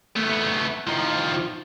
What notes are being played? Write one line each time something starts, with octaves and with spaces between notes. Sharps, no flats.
A3 B3
D#3 F3